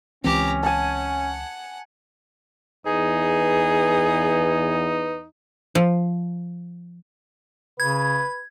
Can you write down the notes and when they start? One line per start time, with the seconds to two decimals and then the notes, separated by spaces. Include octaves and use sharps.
0.24 C#2 E3 C4 C#4 G4 A#5
0.63 F#5 G#5 A5
2.86 E2 D#4 G#4 B4
5.75 F3
7.80 C#3 B4 G#6